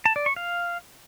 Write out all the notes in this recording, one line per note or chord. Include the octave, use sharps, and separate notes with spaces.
A5
D5
C#6
F5